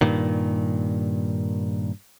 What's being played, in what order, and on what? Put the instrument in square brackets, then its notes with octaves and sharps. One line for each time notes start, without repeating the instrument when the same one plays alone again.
[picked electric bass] G2 A#2 D#3